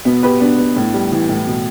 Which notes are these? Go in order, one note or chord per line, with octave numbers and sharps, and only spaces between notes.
B2 B3
B2 G4 B4
B3 D4
B3
A2
G3
E3
A2
B2